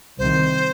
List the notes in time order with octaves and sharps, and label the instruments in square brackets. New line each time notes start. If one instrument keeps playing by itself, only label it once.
[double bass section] C2 C3 D#3 [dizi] C5